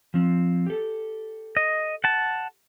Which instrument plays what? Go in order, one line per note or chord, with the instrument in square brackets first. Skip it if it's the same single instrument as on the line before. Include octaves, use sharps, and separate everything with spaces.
[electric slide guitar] F3 C4
G4 A4
[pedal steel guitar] D#5
F#5 A5